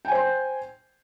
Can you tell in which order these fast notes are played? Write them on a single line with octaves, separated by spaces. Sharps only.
G5 G#5 C5 C6